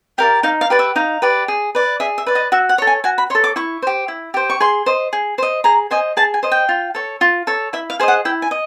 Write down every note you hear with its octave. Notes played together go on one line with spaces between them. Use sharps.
G4 A#4 D5 F5
D#4 F5
F5
G4 B4 D5
E5
D#4 F5
G4 B4 D5
G#4
B4 D5
G#4 E5
E5
B4 D5
D#5
F#4 E5
F#5
A4 C#5
G#5
F#4 G#5
B5
A4 C#5 C6
D6
E4 C#6
G4 C5
E4
G4 C5
C#6
G#4 C6
C5 D#5
G#4
C5 D#5
G#4 A#5
C5 D#5 G#5
G#4 A5
G#5
C5 D#5
G5
F4
A4 C#5
F4
A4 C#5
E4 E5
F5
G#4 C5 D#5
F#5
E4 G5
G#5
D#5